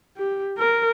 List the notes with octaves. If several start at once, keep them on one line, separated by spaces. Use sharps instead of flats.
G4
A#4